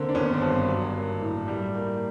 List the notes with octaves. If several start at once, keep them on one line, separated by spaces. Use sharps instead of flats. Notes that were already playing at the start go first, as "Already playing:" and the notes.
Already playing: D3 A#3 C4
D4
G#1 B3 C#4
C4
G2 B3
F#3
A#3
A2
G3
A#3